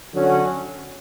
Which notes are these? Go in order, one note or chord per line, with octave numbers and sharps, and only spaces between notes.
D3 F#3 C#4 F#4